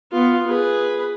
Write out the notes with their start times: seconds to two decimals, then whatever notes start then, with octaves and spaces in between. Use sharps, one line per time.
0.12 B3 F4
0.47 G#4 B4